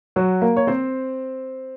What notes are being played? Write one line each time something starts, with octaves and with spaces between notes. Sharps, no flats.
F#3 F#4
A#3 A#4
C#5
C4 C5